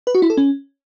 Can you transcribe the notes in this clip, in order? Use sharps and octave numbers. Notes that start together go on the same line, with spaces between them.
B4
F#4
E4
A4
C#4